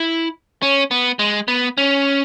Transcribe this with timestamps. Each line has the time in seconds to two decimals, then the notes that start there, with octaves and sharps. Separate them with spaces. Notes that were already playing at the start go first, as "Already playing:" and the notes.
Already playing: E4
0.62 C#4
0.91 B3
1.19 G#3
1.48 B3
1.78 C#4